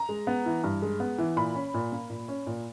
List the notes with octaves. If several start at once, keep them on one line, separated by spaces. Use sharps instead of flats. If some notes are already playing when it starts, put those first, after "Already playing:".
Already playing: A#5
G#3
B3
E3
G2
G#3
B3
E3
A#2 B5
C#4
A#2
A#3
A#2
C#4
A#2